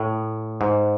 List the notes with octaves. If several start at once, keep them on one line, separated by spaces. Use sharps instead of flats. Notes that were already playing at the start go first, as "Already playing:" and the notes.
Already playing: A2
G#2